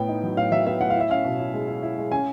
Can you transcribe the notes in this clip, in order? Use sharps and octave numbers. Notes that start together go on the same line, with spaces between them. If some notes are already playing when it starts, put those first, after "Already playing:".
Already playing: A2 B3 G5
D#4
F#3
A2 F5
F#3 E5
B3 E5
A2 F#5
E4 F5
E5
C#4 F5
B2
E4
G#3
E4
E4
G#3
C#4 G#5